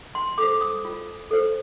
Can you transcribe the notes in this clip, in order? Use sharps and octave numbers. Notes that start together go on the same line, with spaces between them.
C6
A4 C5 D6
D#6
F4
A4 C5